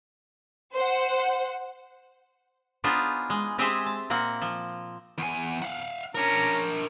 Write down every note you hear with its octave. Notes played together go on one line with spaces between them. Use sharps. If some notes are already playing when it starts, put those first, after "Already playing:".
C5 F#5
B3 D4 D#4 F4 G#4 C5
G#3
G#3 C4 G4 G#4 C5 E5
A5
A#2 A#3 C4 F#5
F3
E2 G#5
F5 F#5
C#4 D4 A#4 A#5